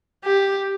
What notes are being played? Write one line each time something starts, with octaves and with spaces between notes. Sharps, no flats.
G4